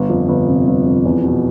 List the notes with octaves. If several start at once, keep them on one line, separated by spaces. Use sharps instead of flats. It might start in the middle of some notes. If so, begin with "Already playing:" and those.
Already playing: G1
F2
G1
C3
G1
F2
E2
B2